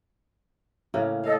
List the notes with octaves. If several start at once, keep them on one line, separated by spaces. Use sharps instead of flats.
A2 C#3 A#3
A4 D#5 F5